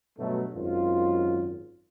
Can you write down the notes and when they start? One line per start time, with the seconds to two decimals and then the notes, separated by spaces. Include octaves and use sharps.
0.18 G2 B2 F#3 A3
0.54 G#1 F#2 F4